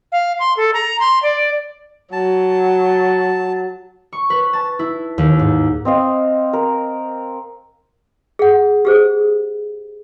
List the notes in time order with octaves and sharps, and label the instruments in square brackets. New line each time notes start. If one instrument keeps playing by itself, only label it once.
[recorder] F5
C6
A4
A#5
C6
D5
[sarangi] F#3 [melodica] A5
[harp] C#6
B4
A5
E4
D#2
G#2
[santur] C4 D#5 F5
A#4
[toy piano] G#4 F#5
G4 G#4 C5